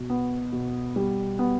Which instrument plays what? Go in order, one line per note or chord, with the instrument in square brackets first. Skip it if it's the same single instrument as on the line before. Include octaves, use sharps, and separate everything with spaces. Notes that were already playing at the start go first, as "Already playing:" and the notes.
Already playing: [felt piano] B2
B3
B2
G3
B3